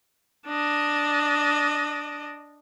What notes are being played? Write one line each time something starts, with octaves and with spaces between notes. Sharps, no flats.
D4 D#5